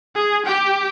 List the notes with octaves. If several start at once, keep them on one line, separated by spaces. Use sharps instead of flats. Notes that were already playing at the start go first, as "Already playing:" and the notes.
G#4
G4 G5